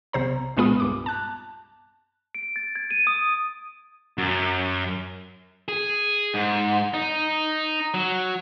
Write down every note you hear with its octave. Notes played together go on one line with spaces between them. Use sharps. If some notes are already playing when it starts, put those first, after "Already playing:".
B1 C3 C5 A#5
C2 A#2 G#3 B3 F4 D#6
C2 G2 D6
A5 F#6
D7
A6
G#6
D#7
D#6
F#2
G#4
G#2
D#4
F#3